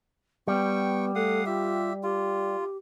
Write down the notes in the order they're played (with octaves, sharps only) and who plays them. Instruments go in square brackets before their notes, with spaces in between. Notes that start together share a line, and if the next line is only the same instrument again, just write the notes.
[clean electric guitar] G3 [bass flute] B3 [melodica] G5 C#6
[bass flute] A3 [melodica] F5 F#5 D#6
[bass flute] F4 [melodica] G4 E5
[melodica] F4 [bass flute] G4